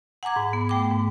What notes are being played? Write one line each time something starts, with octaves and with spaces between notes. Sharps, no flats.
F#5 G#5 A#5 D6 G#6
G#2
B3
A3 G5 D6
G#2